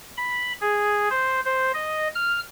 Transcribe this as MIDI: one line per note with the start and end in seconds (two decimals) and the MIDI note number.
0.17 0.52 83
0.61 1.08 68
1.10 1.40 72
1.45 1.72 72
1.74 2.08 75
2.15 2.40 89